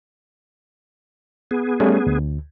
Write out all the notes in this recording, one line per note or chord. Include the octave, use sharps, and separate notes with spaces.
B3 G#4
G3 A3 C#4
D2